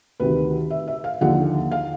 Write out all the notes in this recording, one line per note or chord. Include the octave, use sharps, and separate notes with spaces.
D2 C3 D#3 B4
E5
E5
F5
D#2 D3 F3 F#5
F5